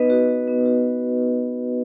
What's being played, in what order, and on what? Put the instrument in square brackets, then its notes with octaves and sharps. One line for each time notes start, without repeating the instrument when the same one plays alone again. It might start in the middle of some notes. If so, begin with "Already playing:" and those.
Already playing: [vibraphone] B3 D#4 B4 D#5
F#4
F#4
B3
F#4